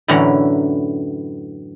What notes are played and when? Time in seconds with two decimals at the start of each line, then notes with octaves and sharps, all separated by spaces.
0.08 F#2 A2 D3 E3 C#4 A#5